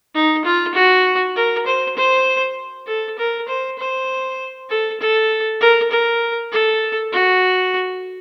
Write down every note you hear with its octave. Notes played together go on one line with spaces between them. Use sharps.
D#4
F4
F#4
A#4
C5
C5
A4
A#4
C5
C5
A4
A4
A#4
A#4
A4
F#4